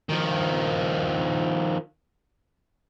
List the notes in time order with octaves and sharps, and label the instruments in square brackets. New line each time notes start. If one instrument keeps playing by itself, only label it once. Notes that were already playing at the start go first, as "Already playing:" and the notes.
[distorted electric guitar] D#3 F3